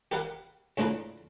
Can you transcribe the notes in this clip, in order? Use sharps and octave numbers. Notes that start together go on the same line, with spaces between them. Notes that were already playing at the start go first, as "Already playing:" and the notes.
G4 A#4 B4 F5 F#5
A2 C#3 D4 F4 B4 A#5